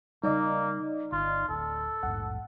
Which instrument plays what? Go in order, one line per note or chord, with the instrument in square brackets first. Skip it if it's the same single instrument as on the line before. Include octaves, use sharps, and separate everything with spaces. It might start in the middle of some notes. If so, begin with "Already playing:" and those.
[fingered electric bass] C#3 G3 [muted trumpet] A#3 [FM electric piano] D#4 D5 D#5
[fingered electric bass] G1 [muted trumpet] F4
[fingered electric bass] D1 [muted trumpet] A4
[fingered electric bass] A#1 E2 G#2 [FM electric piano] F#5